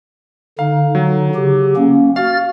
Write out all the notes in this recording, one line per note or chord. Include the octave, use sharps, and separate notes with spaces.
D3 D#4 F5
F#3
C#3 G4
A#3 C#4
F#4 F5 F6 A6